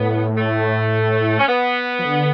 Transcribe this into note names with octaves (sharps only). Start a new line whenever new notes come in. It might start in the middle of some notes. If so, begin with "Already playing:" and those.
Already playing: A2 B3
A3
C#4
B3
F3
D3